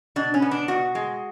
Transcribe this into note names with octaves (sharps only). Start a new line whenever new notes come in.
B2 D4
C#4
B3
D4
B2 F#4
G#3